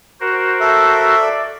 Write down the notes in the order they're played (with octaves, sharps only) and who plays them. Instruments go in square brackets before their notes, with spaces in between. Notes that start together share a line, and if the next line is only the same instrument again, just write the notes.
[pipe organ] F#4 A#4 C5
[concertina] A4 E5
[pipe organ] D5